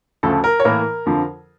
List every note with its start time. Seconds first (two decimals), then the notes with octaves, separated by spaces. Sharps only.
0.23 D2 C#3 F3 A3 A4
0.44 A#4
0.60 C#5
0.65 A2 E3 A#3 A#4
1.06 F2 D3 F3